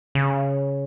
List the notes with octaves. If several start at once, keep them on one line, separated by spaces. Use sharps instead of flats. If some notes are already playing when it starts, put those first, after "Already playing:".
C#3